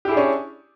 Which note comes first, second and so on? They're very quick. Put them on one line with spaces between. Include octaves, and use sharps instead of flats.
G4 E4 G#4 D4 C#4